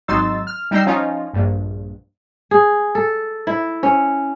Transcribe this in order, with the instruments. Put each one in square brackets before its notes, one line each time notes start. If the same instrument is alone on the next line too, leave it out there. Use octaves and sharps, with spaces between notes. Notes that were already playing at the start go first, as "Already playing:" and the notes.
[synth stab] G#1 F#3 D#4 C6 E6 A6
F6
G3 D#4 G5 A#5 E6 C7
F3 C#4 D#4 F4
A#1 G2
[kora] G#4
A4
E4
C#4